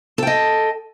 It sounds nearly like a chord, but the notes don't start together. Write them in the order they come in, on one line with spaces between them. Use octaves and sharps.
A4 G5 D#5